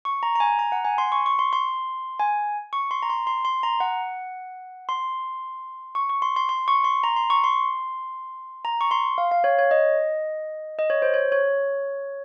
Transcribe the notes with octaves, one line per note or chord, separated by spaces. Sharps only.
C#6
A#5
A#5
G#5
A#5
F#5
G#5
C6
C#6
C#6
C6
C6
G#5
C#6
C6
A#5
C6
C6
C6
A#5
F#5
C6
C#6
C#6
C6
C6
C6
C#6
C6
A#5
C6
C#6
C6
A#5
C#6
C6
F5
F5
C#5
C#5
D#5
D#5
C#5
C5
C#5
C#5